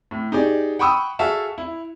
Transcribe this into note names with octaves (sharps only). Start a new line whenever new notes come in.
A2
D#4 G4 G#4 D5
F#5 G5 B5 C#6 D#6 E6
F#4 G#4 A4 E5 F5 A5
E4